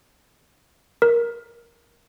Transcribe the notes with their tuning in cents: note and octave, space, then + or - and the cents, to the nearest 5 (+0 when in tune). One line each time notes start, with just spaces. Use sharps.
A#4 +10